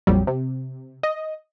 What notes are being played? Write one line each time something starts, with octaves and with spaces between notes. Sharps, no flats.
A#1 F2 F#3 G3
C3
D#5